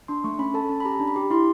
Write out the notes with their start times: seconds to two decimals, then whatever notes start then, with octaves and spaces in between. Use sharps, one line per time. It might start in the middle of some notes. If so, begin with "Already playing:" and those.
0.08 D4 C6
0.24 A3 C#6
0.39 C#4 B5
0.54 A4 A5
0.69 C#4 A5
0.80 B5
0.85 G4 A#5
0.99 D4
1.07 B5
1.16 G4
1.30 E4 C6